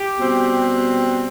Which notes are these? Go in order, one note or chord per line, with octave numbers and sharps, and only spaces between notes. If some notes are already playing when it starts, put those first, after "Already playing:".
Already playing: G4
B2 G3 C4